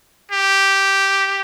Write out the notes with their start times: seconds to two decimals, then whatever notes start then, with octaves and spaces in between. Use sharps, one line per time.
0.32 G4